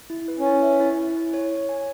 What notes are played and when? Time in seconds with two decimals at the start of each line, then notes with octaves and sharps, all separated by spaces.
0.10 E4
0.28 B4
0.39 C#4
0.46 E4
0.63 E5
0.80 E4
0.99 E4
1.16 E4
1.34 C#5
1.52 C#5
1.69 G#5